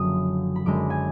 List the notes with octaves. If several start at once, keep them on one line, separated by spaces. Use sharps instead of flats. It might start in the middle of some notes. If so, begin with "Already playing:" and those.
Already playing: F#1 F#2 D3 F3 A#3 D#6
B5
F#2 D3 G#3 D6
G#5